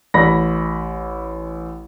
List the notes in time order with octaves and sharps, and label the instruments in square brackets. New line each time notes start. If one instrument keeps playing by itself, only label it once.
[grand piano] A1 B5 A#6